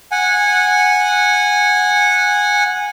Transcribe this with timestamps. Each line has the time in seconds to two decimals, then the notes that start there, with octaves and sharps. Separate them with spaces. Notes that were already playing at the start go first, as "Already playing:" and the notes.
0.12 F#5 G#5